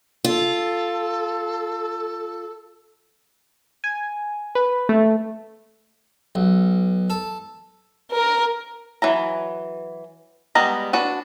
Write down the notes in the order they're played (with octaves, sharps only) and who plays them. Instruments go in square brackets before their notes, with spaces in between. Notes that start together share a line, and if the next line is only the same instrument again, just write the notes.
[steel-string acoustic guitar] F4 [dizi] A4
[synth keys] G#5
B4
A3
[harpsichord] B1
A4
[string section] A#4
[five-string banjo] E3 F#3 A#5
G3 G#3 B3 D#5 A#5
D4 F#4 B4